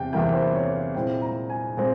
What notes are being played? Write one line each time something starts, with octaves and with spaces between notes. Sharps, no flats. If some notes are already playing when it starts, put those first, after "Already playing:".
Already playing: E2 C3 G5
E2 C3 E3 A#3 E4 G5
C5
C#5
F5
A#2 G#3 C4 E4 G5
A#5
G#5
A#2 G#3 C4